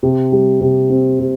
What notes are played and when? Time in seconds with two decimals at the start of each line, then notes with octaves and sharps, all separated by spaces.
0.03 C3
0.32 G3
0.61 C3
0.89 C4
1.19 C3